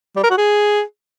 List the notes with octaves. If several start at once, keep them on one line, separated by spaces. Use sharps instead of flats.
G3
A#4
F#4
G#4